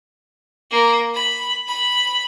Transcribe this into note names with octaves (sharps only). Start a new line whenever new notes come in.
A#3
B5
B5